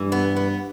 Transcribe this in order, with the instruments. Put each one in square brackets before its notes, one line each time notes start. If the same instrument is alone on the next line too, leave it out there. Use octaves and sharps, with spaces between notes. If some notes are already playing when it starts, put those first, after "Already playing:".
Already playing: [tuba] G2 [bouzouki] E3
[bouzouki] B3
B3